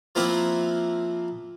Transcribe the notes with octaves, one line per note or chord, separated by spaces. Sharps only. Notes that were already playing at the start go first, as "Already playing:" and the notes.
F3 A#3 C4 E4 F4 F#5